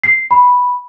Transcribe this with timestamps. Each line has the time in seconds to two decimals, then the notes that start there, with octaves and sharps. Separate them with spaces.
0.04 C7
0.31 B5